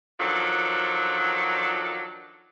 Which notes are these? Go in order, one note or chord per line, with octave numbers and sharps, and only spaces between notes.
D#3 F3 F#3 D4 A4